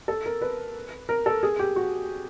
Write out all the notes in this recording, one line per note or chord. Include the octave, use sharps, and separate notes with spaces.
A4
A#4
B4
A#4
A4
G#4
G4
F#4